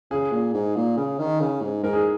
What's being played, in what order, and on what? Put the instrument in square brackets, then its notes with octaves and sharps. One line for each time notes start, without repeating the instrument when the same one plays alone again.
[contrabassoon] C#3 [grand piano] G#4
[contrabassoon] A#2
G#2
A#2
C#3
D#3
C#3
G#2
[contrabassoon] G#2 [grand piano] A#4
[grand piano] G#4